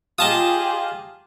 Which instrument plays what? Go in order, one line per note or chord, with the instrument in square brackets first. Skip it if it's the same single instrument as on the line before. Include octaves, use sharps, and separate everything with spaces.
[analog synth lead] F4 [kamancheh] G4 G#4 [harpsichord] D#5 A5 D#6